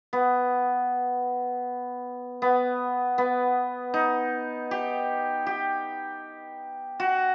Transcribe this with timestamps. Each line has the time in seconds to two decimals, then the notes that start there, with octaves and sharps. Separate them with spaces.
0.13 B3
2.42 B3
3.18 B3
3.94 D#4
4.71 G4
5.47 G4
7.00 F#4